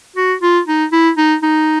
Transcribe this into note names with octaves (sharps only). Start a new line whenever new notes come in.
F#4
F4
D#4
E4
D#4
D#4